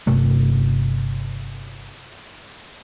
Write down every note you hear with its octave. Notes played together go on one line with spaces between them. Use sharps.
G1 C3 A3